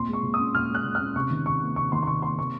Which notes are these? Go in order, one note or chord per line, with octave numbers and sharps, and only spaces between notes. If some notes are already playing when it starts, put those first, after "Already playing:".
Already playing: A#2 C4 C6
G#3
C#6
A#2
D#6
C#4
A#2 F6
G#3
F#6
A#2
C#4 F6
C3 C#6
D#3
C3 C#6
A#3
C3 C#6
D#3 C6
C6
C3 C#6
A#3 C6
C3 C#6